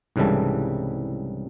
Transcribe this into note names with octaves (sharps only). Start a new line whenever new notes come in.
C2 G#2 C#3 E3 G3 A4